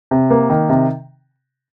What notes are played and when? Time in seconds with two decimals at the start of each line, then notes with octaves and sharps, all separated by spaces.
0.11 C3
0.30 A#3
0.50 D#3
0.69 C3